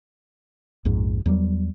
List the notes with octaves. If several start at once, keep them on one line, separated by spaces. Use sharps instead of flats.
A#1 F2 G#2
E2 F#3 G3